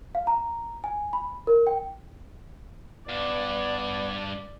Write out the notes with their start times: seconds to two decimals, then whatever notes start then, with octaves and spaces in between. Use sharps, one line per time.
0.15 F5
0.27 A#5
0.84 G#5
1.13 B5
1.47 A#4
1.67 G5
3.09 G2 B3 D4 D5